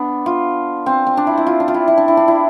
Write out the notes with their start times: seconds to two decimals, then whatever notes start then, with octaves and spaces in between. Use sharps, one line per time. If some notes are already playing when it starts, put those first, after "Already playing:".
Already playing: B3 D4
0.26 F4
0.86 C4
1.07 C4
1.17 D4
1.27 E4
1.38 E4
1.47 F4
1.60 D4
1.68 F4
1.74 E4
1.88 E4
1.97 D4
2.08 E4
2.17 D4
2.28 E4